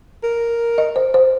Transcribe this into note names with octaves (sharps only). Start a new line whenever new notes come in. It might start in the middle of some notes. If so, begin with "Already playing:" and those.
A#4
D#5
C5
C5